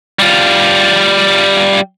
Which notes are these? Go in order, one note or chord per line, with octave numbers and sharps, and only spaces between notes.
G3 F4